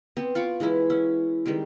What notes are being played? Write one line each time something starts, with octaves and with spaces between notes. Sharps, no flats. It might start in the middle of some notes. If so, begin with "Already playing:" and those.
B3 C4
F4 B5 C#6 D6
E3 G#3 C#4 E4
C#4 E5 F#5
D#3 G3 G#3 C4